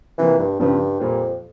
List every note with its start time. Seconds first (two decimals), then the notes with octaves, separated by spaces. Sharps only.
0.18 C3 E3 F3 A#3
0.39 G2
0.60 G2 C#3 F3 C4
1.00 F2 A#2 G3 A#3